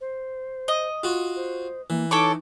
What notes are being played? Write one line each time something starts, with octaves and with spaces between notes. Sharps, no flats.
C5
D#5
F4 F#4
C5
E3 A#3
D#4 A4 C#5 D6